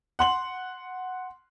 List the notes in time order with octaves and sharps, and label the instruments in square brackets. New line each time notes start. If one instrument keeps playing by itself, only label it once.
[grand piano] F#5 C6 F#7